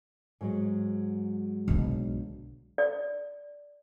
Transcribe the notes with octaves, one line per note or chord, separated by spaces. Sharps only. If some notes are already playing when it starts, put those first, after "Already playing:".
G#2 F#3 G#3
B1 D3
D5